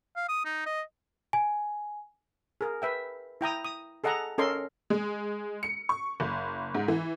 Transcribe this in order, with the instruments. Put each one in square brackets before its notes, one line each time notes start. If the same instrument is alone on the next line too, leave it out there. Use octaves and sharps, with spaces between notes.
[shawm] F5
D#6
D#4
D#5
[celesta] G#5
[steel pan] G#4 A#4
B4 E5 G5
E4 G5 A#5 D#6
D#6
G#4 A4 D#5 F#5 A5 A#5
C#4 A4 A#4 D#5 C6
[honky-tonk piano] G#3
C#7
C#6
F#1
G#2
E3